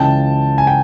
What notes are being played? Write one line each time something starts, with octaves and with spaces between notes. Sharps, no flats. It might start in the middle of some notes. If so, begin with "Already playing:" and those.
Already playing: C#2 C#3 E3 G5 A5
G#5
G5